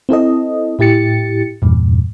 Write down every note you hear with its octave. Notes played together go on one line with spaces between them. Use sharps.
C4 E4 A4 D#5
A2 E4 G4 A6 C#7
E2 G2 A#2